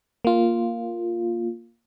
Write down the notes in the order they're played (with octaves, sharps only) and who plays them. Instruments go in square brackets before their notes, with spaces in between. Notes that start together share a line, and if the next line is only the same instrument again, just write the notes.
[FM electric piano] A#3 F4